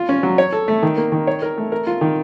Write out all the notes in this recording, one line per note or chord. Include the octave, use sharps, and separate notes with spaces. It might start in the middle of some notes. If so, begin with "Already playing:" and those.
Already playing: F4
C#4
F#3
C#5
A4
A3
D#3
A#3
D#3
C#5
A#4
A3
A#4
F4
D#3